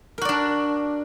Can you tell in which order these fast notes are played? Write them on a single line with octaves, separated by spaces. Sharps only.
A#4 F#4 D5 D4